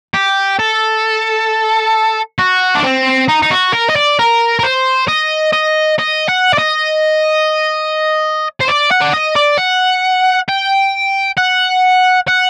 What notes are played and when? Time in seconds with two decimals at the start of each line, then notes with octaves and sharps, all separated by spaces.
0.14 G4
0.59 A4
2.39 F#4
2.75 D4
2.83 C4
3.28 D#4
3.42 D#4
3.51 F#4
3.73 A#4
3.89 D#5
3.96 D5
4.19 A#4
4.59 A#4
4.63 C5
5.08 D#5
5.53 D#5
5.99 D#5
6.29 F#5
6.53 D5
6.59 D#5
8.61 C5
8.68 D5
8.91 F#5
9.02 D5
9.14 D#5
9.36 D5
9.58 F#5
10.49 G5
11.38 F#5
12.28 F#5